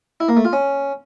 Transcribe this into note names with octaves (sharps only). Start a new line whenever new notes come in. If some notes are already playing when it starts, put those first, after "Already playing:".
E4
A#3
A3
F4
C#4